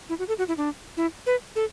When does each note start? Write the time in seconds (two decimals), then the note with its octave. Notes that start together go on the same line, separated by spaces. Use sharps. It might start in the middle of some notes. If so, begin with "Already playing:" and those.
0.09 E4
0.19 F#4
0.28 A4
0.38 F#4
0.48 E4
0.57 D4
0.97 E4
1.26 B4
1.56 A4